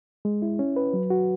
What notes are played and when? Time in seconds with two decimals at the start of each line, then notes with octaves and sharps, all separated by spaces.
0.25 G#3
0.42 E4
0.59 C#4
0.76 B4
0.94 F#3
1.10 F#4